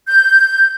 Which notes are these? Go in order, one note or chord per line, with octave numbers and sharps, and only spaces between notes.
G6